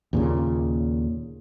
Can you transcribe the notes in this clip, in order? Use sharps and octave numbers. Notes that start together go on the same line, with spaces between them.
D#2 A#2 C#3